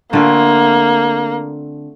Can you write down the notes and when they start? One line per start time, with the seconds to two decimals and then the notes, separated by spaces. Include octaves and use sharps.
0.13 D3 A3 A#3 C4 F4